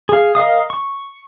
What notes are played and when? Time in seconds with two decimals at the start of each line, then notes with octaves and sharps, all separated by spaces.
0.09 G#4 F5
0.35 A#4 D#5 F5 D#6
0.70 C#6